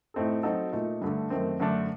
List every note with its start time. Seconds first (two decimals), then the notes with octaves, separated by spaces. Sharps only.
0.14 A2 A3 C4 D#4 A4
0.43 F#3 C4 D#4 F#4 A4
0.73 A#2 A3 D#4
1.02 G2 D3 A3
1.30 F#2 D#3 A3 C4
1.60 F#2 D3 A3 D4